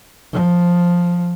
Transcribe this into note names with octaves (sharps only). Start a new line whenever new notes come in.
F3